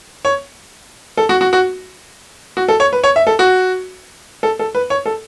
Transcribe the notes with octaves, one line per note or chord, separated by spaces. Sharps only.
C#5
A4
F#4
F#4
F#4
F#4
A4
C#5
B4
C#5
E5
A4
F#4
A4
A4
B4
C#5
A4